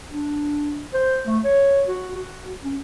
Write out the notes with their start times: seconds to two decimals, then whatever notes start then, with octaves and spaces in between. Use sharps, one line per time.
0.09 D4
0.93 C5
1.26 A3
1.44 C#5
1.87 F#4
2.15 F#4
2.64 C#4